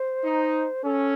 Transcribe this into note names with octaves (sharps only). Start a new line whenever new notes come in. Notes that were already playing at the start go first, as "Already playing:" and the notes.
Already playing: C5
D#4
C#4 A4